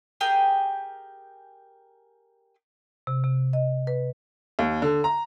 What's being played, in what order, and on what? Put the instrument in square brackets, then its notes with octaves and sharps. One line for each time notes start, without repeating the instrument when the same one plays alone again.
[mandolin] G4 G#4 A#4 G5
[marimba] C3
C3
D#5
B4
[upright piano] D#2
D3
A#5